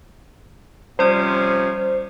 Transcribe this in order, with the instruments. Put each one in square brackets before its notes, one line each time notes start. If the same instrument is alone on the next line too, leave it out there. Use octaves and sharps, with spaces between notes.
[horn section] C3 F3 C#4 [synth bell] G3 D5 [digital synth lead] C5